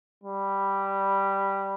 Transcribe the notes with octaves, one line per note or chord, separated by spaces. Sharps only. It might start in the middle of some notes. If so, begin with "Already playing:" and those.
G3